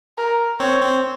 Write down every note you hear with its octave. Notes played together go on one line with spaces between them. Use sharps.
A#4
C4 C#5
C4